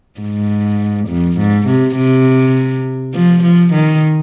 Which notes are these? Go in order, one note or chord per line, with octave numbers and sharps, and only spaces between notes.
G#2
F2
G#2
C3
C3
F3
F3
D#3